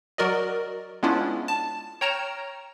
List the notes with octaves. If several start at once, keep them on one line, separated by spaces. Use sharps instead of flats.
F#3 F#4 A#4 D5 D#5
G#3 B3 C#4 D4 E4 F4
A5
C#5 G5 A#5 F6 E7